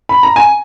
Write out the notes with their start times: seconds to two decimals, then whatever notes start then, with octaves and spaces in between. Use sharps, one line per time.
0.09 B5
0.23 A#5
0.36 G#5